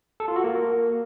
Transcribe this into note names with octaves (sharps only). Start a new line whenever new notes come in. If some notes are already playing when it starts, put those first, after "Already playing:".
A4
F4
F#4
A#3